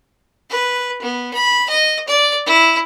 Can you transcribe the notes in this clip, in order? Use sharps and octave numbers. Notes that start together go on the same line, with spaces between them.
B4
B3
B5
D#5
D5
E4